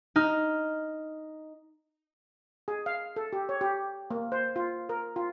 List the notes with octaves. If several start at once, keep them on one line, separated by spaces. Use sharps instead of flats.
D#4 F6
G#4
F5
A4
G4
C#5
G4
A#3
C5
F4
A#4
F4